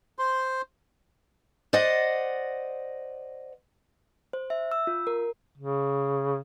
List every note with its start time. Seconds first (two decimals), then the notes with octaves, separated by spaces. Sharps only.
0.19 C5 C6
1.73 C5 D5 D#5 F#5
4.33 C5
4.50 E5
4.71 E6
4.87 F4
5.07 A#4
5.58 C#3